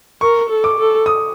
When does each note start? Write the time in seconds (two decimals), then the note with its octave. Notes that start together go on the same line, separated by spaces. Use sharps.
0.21 A#4 C#6
0.49 A4
0.64 D6
0.78 A4
1.06 D#6